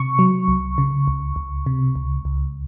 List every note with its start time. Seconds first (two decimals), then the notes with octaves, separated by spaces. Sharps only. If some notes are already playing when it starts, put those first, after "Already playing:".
Already playing: C3 C#6
0.19 F#3
0.48 C2
0.78 C#3
1.08 C#2
1.36 C#2
1.66 C3
1.96 C#2
2.25 C#2